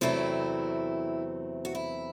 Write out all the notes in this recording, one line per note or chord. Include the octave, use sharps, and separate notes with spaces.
E2 C3 F#3 A3 C4 E4
F#4
E4